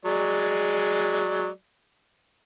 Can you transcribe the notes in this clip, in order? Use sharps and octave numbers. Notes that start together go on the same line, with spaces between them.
F#3 G#3 D5